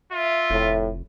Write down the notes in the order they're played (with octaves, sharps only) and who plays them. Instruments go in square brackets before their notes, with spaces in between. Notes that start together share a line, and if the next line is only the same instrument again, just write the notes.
[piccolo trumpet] F4 [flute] E5
[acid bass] F1 [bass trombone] A2